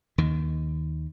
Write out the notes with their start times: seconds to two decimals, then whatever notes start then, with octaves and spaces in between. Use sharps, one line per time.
0.18 D#2 D#3